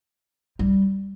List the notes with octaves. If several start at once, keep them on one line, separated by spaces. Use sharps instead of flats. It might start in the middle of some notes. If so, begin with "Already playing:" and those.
G3